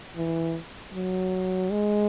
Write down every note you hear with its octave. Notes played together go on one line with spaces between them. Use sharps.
E3
F#3
G#3